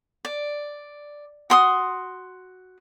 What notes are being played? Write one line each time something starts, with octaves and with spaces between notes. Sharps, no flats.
D5
F#4 C6 D#6